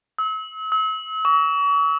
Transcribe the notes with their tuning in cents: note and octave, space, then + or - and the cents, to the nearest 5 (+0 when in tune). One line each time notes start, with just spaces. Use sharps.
E6 -40
E6 -40
C#6 +40